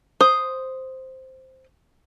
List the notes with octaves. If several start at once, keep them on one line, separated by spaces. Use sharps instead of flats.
C5 D#6